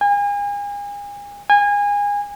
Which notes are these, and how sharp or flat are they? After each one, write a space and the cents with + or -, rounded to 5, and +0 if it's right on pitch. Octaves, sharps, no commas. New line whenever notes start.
G#5 -35
G#5 -25